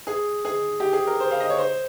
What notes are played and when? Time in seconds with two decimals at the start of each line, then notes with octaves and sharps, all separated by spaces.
0.07 G#4
0.45 G#4
0.80 G4
0.93 G#4
1.07 A#4
1.20 C5
1.31 F5
1.40 D#5
1.50 C#5
1.58 C5